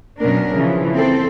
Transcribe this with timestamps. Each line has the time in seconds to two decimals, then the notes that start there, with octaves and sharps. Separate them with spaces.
0.20 F#2 B2 F#3 C#4 D4 A#4
0.54 C#3 E3 F3
0.95 C4 A4